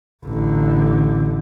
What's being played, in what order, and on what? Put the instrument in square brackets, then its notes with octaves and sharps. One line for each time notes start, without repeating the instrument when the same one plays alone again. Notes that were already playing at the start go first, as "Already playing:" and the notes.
[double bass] A1 D3